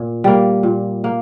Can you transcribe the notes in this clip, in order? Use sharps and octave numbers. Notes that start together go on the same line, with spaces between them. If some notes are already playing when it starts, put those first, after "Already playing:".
Already playing: A#2
G3 A#3
A#2
A#3